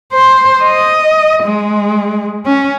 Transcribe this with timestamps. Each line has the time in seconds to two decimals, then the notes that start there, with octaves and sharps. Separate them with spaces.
0.13 C5
0.63 D#5
1.43 G#3
2.46 C#4